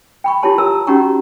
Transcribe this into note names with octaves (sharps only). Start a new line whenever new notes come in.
G5 B5 C#6
E4 F4 G4 C#5 A5 C6
A#4 A#5 E6
C#4 D#4 F#4 G4 A#5 C#6